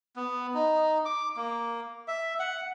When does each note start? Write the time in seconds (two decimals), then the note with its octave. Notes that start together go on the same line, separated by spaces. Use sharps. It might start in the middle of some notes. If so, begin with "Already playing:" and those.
0.16 B3
0.54 D#4
1.05 D6
1.36 A#3
2.08 E5
2.39 F#5